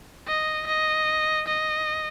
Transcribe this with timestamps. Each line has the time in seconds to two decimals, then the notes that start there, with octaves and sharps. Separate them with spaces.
0.27 D#5
0.67 D#5
1.48 D#5